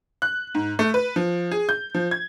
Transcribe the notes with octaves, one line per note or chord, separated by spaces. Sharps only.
F#6
G#2
A3
B4
F3
G#4
G6
F3
G#6